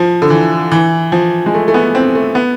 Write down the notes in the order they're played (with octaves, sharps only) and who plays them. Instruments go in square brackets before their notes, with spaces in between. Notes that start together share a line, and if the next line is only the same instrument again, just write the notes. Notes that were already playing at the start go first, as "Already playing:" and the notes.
Already playing: [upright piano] F3
D3
E3
E3
F3
G#3
A3
A3
B3
C4
A3
B3